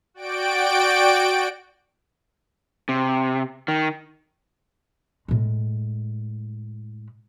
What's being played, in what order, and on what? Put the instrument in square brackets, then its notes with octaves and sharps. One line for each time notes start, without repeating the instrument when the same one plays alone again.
[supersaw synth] F#4 D5 G5 D7
[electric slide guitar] C3
D#3
[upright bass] A2 G#3